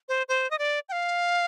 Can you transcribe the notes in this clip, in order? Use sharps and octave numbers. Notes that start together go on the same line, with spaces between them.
C5
C5
D#5
D5
G5
F5